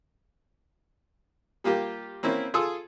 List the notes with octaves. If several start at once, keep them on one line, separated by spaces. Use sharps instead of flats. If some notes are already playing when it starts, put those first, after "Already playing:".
G3 A#3 F4 G4
A#3 C4 C#4 E4
F4 G#4 A4 C6 D#6 E6